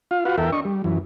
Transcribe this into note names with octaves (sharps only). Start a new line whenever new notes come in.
F4 F5
F4 F#4 B4 F5 F#5
E2 A4 A#4 E5 G5
D4 D#5 C#6
G3
F#2 E3